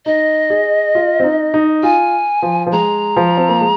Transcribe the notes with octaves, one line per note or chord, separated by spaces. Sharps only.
D#4 D#5
G#4
F4
C4
D#4
D#4
F4 G#5
F3
F3
G#3 A#5
F3
C4
A#3
G#3